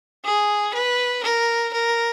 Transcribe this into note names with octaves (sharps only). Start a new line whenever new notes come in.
G#4
B4
A#4
A#4